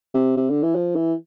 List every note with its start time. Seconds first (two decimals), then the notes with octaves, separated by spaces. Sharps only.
0.14 C3
0.37 C3
0.50 D3
0.63 E3
0.75 F3
0.96 E3